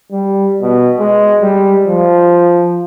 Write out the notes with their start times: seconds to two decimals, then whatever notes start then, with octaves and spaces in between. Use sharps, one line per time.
0.12 G3
0.61 B2
0.99 G#3
1.42 G3
1.88 F3